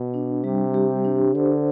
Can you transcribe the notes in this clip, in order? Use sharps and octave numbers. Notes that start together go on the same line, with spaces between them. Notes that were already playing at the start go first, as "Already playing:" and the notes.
Already playing: B2
D4
C3 G3
G4
D4
D3 C5